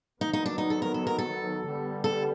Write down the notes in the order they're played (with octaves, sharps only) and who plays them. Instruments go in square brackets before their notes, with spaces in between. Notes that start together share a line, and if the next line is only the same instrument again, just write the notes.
[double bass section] D#3 F#3 B3 [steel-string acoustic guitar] D#4
[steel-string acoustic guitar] D#4
D4
D#4
A4
A#4
A4
A#4
A4
[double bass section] D3 G3 B3
[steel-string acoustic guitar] A4